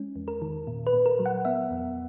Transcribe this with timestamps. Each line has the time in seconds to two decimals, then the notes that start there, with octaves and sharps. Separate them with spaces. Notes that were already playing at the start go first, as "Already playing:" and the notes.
Already playing: G#3 C#4
0.16 E2
0.28 A#4
0.42 D#3
0.67 A#2
0.87 B4
0.93 A#2
1.06 A#4
1.19 F#3
1.26 F#5
1.45 B3 E5
1.71 E2